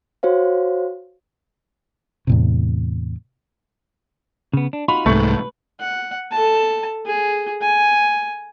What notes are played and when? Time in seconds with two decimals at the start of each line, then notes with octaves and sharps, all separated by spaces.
0.23 F#4 C5 C#5 F5
2.27 E2 A2 C3
4.53 C#3 B3
4.73 D4
4.88 D#4 F4 F#4 B5
5.06 C2 G#2 A3 B4 C#6
5.80 F#5
6.32 A4 A5
7.06 G#4
7.62 G#5